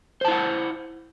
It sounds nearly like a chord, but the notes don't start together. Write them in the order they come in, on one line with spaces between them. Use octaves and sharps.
C5 A5 E4 F#5